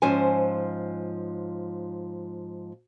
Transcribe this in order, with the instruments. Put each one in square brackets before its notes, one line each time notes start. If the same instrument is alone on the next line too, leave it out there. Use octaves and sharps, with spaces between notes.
[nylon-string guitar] G#2 F3 C#4 C5 G#5